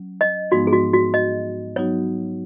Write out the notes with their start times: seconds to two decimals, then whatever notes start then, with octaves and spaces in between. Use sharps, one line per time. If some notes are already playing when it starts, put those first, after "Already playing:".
Already playing: F#3 C#4
0.21 D#5
0.51 G#2 F3 G#3 B3 D#4 F#4
0.67 G#4
0.73 F#4
0.93 F#4
1.14 D#5
1.76 F#3 B3 D#4 F#4 C#5